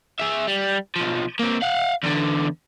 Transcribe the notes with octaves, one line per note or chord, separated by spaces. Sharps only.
G#4 E5
G3
B1 F3
A#3 C4
F5 F#5
E2 D3